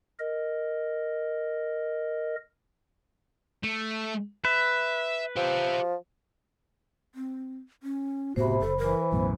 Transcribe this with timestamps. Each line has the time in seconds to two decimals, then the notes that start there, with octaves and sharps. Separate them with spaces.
0.19 A#4 D#5
3.63 A3
4.45 B4 E5
5.36 F3 G4 E5
7.15 C4
7.83 C#4
8.36 F#1 A2 C3 B3 F#4 C5 B5
8.61 F#1 A4
8.78 E3 A#4
9.12 B1 F#2 A2 B3